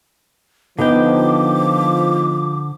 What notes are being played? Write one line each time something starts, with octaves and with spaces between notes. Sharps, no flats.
D3 F3 B3 D#4 G5 D6